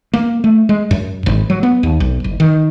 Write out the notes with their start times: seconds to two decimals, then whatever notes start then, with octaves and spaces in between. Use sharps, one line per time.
0.13 A#3
0.44 A3
0.69 G#3
0.91 F#2
1.26 G#1
1.50 F#3
1.63 B3
1.83 D#2
2.00 B1
2.24 F#1
2.40 D#3